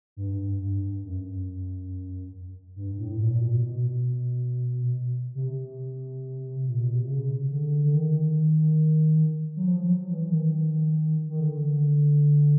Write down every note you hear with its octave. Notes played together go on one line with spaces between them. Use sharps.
G2
G2
F#2
G2
A2
A#2
A#2
B2
B2
C3
A#2
B2
C3
C#3
D3
D3
D#3
F#3
F3
F#3
E3
E3
D#3
D#3
D3